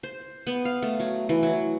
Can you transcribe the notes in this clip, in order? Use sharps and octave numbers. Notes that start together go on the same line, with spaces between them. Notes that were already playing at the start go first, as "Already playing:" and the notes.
C5
B3
F5
A3
F#3
E3
F#3